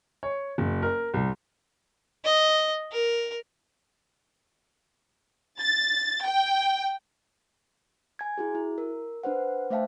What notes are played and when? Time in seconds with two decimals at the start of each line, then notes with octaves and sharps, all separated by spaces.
0.23 C#5
0.58 F#1
0.82 A#4
1.14 C2
2.24 D#5
2.92 A#4
5.60 A6
6.25 G5
8.19 G#5 G#6
8.38 E4 F#4 G#4
8.55 E4
8.78 A#4
9.23 D4 B4 C5 F#5
9.70 A3 C5 E5 F5 G5 A5